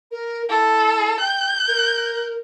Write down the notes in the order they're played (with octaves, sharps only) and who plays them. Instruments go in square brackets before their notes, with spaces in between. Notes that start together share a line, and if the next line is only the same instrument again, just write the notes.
[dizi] A#4
[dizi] E4 [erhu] A4
[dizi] G5 [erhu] G6
[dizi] A#4